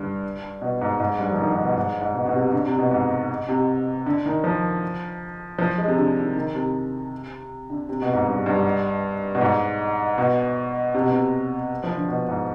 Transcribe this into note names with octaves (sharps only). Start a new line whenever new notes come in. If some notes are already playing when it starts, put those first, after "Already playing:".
Already playing: G2 D3
B2
G#2
G#2
G2
F3
D#3
D#3
B2
G#2
G#2
B2
B2
C3
D3
C3
B2
G#2
C3
D3
D#3
F3
F3
G#3
C3
D3
D#3
D#3
C3
D3
C3
B2
G#2
G2
G2
B2
G#2
B2
C3
B2
C3
F3
D3
B2
G#2